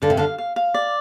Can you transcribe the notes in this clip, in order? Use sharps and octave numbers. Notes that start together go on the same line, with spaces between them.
D3 F5
C3
D3 F5
F5
F5
D5